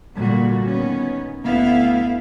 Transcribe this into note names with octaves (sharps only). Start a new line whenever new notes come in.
A#2 D3 G3 F#4
D#3 B3 C#4
D2 A3 B3 E4 E5 F5